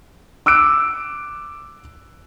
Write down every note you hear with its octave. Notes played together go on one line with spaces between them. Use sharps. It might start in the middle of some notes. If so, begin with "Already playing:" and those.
D6 E6 F#6 D7